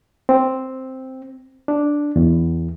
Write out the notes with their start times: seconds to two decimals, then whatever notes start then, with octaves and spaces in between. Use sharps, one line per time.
0.29 C4
1.68 D4
2.16 E2